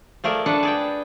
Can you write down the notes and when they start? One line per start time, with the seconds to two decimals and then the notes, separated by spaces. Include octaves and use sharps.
0.24 F3 A3 G#4 A#4 D5
0.46 D4 A4 B4 F#5 A5
0.63 G#4 D5 G5